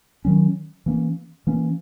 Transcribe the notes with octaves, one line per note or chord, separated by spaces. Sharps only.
D#3 F#3 C#4
E3 A#3 C#4
E3 A#3 C#4